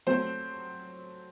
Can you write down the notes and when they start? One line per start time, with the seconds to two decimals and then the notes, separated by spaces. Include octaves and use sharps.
0.07 F#3 A3 C4 C5